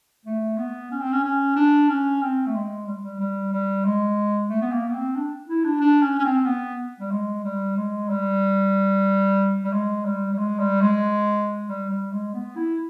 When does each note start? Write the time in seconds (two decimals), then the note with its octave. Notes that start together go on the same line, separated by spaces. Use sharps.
0.26 A3
0.58 B3
0.91 C#4
1.01 C4
1.12 C#4
1.23 C#4
1.56 D4
1.89 C#4
2.22 C4
2.46 A3
2.55 G#3
2.86 G3
3.02 G3
3.20 G3
3.52 G3
3.85 G#3
4.49 A3
4.62 B3
4.72 A#3
4.88 B3
4.94 C4
5.15 D4
5.48 E4
5.64 D4
5.81 D4
6.02 C#4
6.18 C#4
6.24 C4
6.46 B3
7.00 G3
7.11 G#3
7.44 G3
7.76 G#3
8.09 G3
9.64 G3
9.73 G#3
10.05 G3
10.33 G3
10.38 G#3
10.59 G3
10.81 G#3
11.68 G3
11.90 G3
12.12 G#3
12.34 B3
12.56 E4